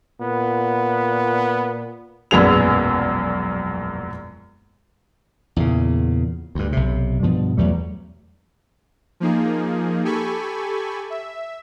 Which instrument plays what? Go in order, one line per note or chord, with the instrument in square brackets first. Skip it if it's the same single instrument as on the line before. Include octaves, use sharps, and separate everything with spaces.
[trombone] A#2 [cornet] B3
[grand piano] E1 A#1 F#2 B3 G#4 F7
[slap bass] E2 A#2 C#3
D2 G2
B1 C3
G2 B2 F3
E2 F#3 G3 A3
[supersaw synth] F3 A#3 D#4 G#4
G4 A4 G#5 B5 C#6
E5